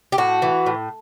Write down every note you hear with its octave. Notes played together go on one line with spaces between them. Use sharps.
G4
A2 F#4
E3
A2